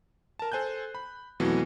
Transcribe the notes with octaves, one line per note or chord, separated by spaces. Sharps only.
A#4 A5
A4 C5 G#5 F#6 G6
B5
F2 B2 E3 F#3 A3